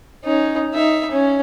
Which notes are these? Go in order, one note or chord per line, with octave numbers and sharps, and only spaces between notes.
C#4 D#4
D#4 E5
C#4